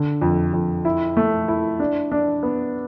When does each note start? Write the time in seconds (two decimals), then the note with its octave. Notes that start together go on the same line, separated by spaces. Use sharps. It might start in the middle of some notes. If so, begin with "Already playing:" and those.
Already playing: D3
0.21 F2
0.53 F2
0.85 E4
1.17 A3
1.48 E4
1.80 D4
2.12 D4
2.43 B3